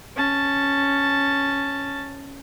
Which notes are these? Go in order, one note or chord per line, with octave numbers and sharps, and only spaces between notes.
C#4 A5